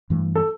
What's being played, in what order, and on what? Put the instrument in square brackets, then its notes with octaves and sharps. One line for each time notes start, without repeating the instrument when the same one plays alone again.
[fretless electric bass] G2 E3 A3
[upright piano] A4